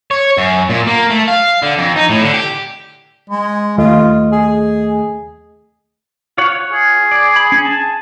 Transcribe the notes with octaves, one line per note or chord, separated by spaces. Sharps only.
C#5
F#2
A#2
A#3
A3
F5
D3
F2
D#4
A2
D3
G4
G#3
D#2 A3 F4 D#5
G#4
F4 C#5 F#5
G#4
D5
B5
C#4
G#5 A5